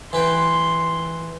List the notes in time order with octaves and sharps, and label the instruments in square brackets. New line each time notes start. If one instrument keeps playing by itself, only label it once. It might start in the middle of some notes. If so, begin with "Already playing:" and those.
[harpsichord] E3 B4 G5 [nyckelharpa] C6